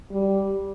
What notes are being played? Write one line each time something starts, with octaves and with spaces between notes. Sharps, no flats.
G3